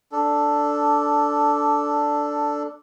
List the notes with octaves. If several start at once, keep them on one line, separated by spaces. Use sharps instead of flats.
D4 A4